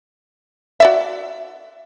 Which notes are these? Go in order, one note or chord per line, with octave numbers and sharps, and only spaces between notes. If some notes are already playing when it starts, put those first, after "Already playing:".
F#4 D5 E5